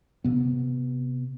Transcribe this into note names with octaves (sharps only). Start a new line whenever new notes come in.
C3 B3